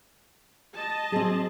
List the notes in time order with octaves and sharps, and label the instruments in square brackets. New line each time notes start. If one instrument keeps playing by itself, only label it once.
[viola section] D#5 A5
[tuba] F#3 [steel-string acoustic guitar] C4 G#4